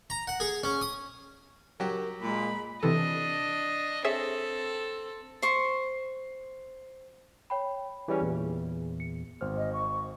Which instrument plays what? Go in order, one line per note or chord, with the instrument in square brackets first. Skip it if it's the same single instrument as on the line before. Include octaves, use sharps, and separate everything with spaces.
[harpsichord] A#5
F#5
G#4
C#4
D#6
[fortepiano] F#3 G4 [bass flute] A#4
[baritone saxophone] A#2 [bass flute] G#3 [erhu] B5
[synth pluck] C3 E3 A4 [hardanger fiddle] D4 D#5
[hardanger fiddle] C4 A4 [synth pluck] G#4 C#5 E5
[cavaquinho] C5 C#6
[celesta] C#5 G5 B5
[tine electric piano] E3 G3 C#4 [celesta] G#4 B4
[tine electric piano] E2 A#2
[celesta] C#7
[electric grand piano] G#1 C5 F6
[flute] D#5
C#6